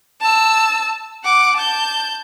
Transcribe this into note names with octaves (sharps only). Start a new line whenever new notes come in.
A5 E6
F#5 D6
A5 G6